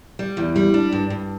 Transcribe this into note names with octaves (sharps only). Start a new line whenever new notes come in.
G3
E2
G3
D4
G2
G2